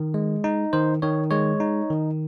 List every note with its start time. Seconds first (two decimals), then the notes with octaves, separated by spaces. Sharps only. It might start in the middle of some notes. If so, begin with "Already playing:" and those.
Already playing: D#3
0.14 G#3
0.44 D#4
0.73 D#3 C5
1.02 D#3 C#5
1.31 G#3 C#5
1.60 D#4
1.90 D#3